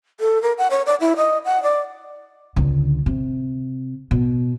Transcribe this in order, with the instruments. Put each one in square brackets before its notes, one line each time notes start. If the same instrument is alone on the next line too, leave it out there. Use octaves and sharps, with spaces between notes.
[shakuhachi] A4
A#4
F#5
C#5
D5
E4
D#5
F#5
D5
[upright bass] C#2 D3
C3
B2